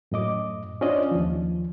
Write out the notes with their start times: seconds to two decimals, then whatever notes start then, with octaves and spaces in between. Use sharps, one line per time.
0.12 F#2 A2 D#5 D6
0.81 C#4 D4 F4 C5 D5 D#5
1.11 D#2 F3